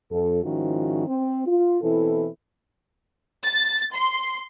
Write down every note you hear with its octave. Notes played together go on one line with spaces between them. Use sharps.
F2 A4
G#2 D#3 F3 C#4 E4 F#4
C4
F4
B2 E3 C4 E4 A4
A6
C6